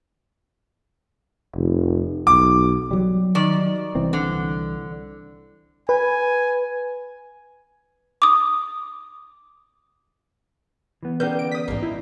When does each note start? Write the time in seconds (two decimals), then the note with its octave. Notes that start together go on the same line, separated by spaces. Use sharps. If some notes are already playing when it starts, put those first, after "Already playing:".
1.56 F1
2.27 B1 D6
2.91 F#3 G3
3.35 D#3 D5
3.95 C2 E3 C4
4.13 D3
5.89 B4 G#5
8.22 D6 D#6
11.03 E3 B3
11.20 D3 G#3 A#3 C#4 B4 G6
11.39 D7
11.52 D#6 B6
11.68 A#1 G#2 A#3 D#4
11.83 E4